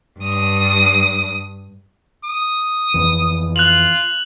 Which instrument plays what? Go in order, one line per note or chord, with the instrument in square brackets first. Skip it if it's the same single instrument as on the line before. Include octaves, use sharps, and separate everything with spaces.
[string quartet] G2 D#6
[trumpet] D#6
[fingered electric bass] F2 E3
[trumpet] F4 [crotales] F#6 F7 F#7